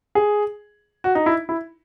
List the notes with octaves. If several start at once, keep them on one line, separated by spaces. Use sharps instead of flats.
G#4
F#4
D#4
E4
E4